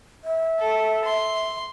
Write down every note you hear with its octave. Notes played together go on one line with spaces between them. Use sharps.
E5
A4
C6